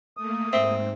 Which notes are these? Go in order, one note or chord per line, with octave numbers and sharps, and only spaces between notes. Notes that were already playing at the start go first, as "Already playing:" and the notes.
A3 A#3 D#6
G#2 C4 E5 G7